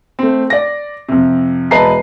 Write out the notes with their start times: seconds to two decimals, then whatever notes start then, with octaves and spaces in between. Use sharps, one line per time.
0.19 A3 C4
0.50 D5 A#6
1.09 F2 C3
1.71 E1 B4 D#5 A5 A#5 C7